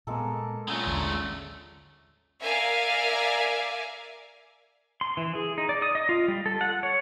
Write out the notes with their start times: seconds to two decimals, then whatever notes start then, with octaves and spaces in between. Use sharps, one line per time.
0.07 A#2 G#3 A#3 B3 A4
0.68 A#2 C#3 F#3 G#3 A3
0.86 A1 D#2 D3
2.40 A#4 D5 E5 F5 G#5
5.01 C6
5.17 E3
5.35 G#4
5.58 D#4
5.69 D5
5.82 D#6
5.95 D#5
6.09 F4
6.28 G3
6.46 A4
6.61 F#5
6.83 C#5